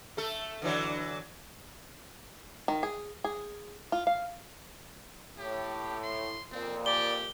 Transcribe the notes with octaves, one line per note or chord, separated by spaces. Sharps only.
A3 A4
D3 E3 F#3
D#3
G#4
G#4
F4
F5
A2 G4
C6
F2 A#2 C4
G4 D5 G7